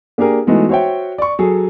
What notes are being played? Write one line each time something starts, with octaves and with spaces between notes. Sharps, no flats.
A#3 D4 G4 G#4 A#4
E3 G#3 A3 B3 D#4 F#4
F#4 C5 C#5 E5 G5
D5 C#6
F#3 G#4 A4